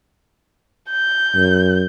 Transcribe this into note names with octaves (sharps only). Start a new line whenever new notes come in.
G6
F#2